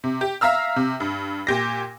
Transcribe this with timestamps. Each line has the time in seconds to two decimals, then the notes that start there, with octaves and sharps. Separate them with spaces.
0.04 C3
0.21 G4
0.41 E5 F5 A#5 E6 F6
0.76 C3
1.00 G2
1.47 A#2 G4 A#6